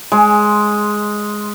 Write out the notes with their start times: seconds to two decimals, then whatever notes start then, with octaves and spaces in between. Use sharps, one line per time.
0.12 G#3